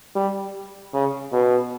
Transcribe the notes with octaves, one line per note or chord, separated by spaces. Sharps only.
G3
C#3
B2